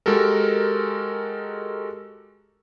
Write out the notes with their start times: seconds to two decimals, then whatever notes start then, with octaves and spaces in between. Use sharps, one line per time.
0.06 G#3 F#4 G4 A4 A#4